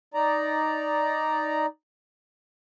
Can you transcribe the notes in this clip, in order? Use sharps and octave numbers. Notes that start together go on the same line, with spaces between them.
D#4 D5 A#5